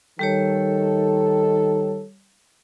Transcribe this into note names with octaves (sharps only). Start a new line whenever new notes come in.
D#3 G3 G4 A4 C#5